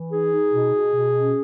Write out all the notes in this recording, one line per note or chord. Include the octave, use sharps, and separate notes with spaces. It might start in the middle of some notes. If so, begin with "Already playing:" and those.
Already playing: E3
D#4 G#4
D#4
B2
B2
B2
C#4